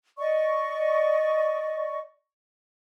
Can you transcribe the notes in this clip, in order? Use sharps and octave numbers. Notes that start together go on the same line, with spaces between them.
D5 D#5 C#6